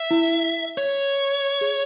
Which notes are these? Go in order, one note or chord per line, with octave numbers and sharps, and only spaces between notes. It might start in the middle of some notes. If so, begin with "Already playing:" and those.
Already playing: E5
E4
C#5
G#4